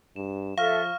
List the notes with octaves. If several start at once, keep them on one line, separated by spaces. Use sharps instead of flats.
G2 E7
F3 A4 E5 F5 C#6 F6 F#6